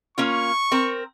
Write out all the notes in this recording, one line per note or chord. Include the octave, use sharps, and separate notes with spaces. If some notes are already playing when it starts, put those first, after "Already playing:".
A#3 C#4 F4 C#6
C4 A#4